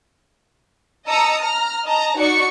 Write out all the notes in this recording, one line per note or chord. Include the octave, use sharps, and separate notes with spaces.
D#5 A5 A#5 D#6 E6 C#7
A#5 F6
D#5 A5 A#5
D#4 F#4 D5 C#6 C#7